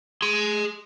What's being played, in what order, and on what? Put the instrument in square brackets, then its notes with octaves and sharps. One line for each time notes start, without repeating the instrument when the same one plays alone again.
[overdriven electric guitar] G#4 C6